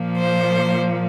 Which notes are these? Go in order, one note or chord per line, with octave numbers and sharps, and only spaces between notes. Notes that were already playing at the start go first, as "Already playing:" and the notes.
Already playing: A#2 F3 A#3
C5